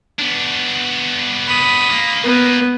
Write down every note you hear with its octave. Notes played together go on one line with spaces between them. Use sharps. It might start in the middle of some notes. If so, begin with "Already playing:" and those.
B3 D4
B5 D#6
C#2 A#3
B3